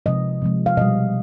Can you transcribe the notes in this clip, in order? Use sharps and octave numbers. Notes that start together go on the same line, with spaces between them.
C3 F3 G#3 D#5
C3 F3 G#3
F5
B2 G3 D#5